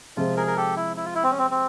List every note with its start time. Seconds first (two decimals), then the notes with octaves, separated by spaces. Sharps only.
0.17 C3 F3 G#3 F4
0.37 G#4 A#4
0.47 A#4
0.57 G4 A4
0.76 E4
0.97 E4
1.05 F4
1.15 E4
1.24 C4
1.31 C#4
1.38 C4
1.51 C4